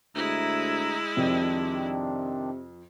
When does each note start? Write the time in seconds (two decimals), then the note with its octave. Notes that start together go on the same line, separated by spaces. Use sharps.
0.15 D2 G#3 E4 E5 A#5
1.17 F2 C3 D#3 C4 D4